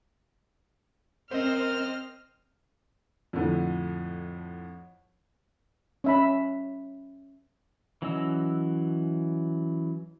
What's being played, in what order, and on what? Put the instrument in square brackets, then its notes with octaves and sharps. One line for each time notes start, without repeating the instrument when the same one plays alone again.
[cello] C4 [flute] A#4 [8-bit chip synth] C5 D#5 [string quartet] F6
[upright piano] F2 A2 D3 F3
[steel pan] C#4 E5 B5
[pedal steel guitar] E3 F#3 C#4 D#5 E6